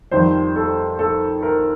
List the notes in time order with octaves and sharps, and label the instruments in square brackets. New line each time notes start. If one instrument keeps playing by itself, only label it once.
[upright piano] F2 D#3 G3 C5
A4
A4
A#4